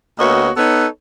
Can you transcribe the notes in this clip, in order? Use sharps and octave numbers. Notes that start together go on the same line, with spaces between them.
D2 A#3 B3 F#4 C#5 D#5
B3 D#4 A4 B4 C#5